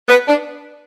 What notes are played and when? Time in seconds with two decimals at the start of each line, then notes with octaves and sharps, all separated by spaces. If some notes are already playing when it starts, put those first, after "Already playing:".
0.09 B3
0.28 D4